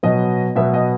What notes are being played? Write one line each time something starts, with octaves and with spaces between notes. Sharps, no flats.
B2 F#3 B3 D#5
B2 F#3 B3 E5
D#5